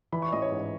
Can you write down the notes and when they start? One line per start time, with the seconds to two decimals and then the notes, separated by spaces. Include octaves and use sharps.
0.12 E3 B5
0.22 C#6
0.32 A1 D#5
0.42 C#5
0.52 G#2